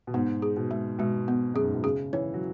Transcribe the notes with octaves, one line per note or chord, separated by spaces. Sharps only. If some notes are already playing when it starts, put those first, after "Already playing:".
B2
G#2 B3
G#4
B2
G#3
B2 G#3
B3
F#2 G#4
G#2
B2
C#3 G#4
E3 C#5
F#3